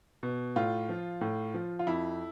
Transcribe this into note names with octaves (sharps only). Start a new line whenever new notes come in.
B2
A2 F4
F3
A2
F3
F4
F2 E4